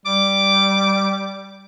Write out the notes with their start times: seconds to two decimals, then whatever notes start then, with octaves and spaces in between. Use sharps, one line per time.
0.06 G3 D6